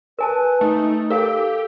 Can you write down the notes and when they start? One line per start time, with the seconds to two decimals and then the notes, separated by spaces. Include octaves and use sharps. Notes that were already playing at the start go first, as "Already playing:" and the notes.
0.19 A#4 B4 G#5 A5
0.61 A3 D#4
1.10 G4 A4 A#4 F5